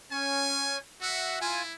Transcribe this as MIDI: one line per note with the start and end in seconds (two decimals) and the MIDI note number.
0.11 0.79 61
0.11 0.77 80
1.01 1.39 66
1.01 1.40 76
1.01 1.40 78
1.41 1.74 64
1.41 1.63 65
1.41 1.63 80